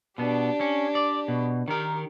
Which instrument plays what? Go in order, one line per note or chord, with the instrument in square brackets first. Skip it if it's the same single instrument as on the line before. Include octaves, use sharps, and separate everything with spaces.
[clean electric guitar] B2 B3 [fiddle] D4 G4
[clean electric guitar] C#4
D5
B2
[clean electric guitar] D#3 A#4 [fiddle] G4